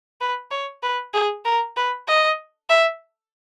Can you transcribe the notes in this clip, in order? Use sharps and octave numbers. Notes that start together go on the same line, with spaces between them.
B4
C#5
B4
G#4
A#4
B4
D#5
E5